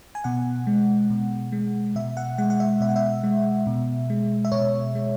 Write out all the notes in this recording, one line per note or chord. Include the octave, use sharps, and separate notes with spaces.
G#5
B2 F#5
G#3
B2
G#3
B2 E5
F#5
G#3 F#5
F#5
E5
B2 E5
F#5
E5
G#3
B2
G#3
E5
B2 C#5
G#3